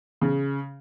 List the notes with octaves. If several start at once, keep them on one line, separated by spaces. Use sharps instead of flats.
C#3